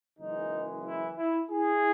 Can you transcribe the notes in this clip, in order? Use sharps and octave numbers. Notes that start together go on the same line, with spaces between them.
F#1 F#2 E3 G#3 D#4
E4
E4
E4 G#4